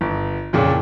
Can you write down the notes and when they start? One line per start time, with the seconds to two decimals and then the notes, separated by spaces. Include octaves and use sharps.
0.01 G1
0.53 F2 A#2 C#3 E3